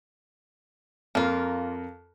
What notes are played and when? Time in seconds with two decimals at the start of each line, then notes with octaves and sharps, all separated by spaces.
1.15 F2 A#3 F4 A#4